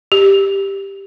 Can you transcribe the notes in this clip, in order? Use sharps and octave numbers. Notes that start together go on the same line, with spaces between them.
G4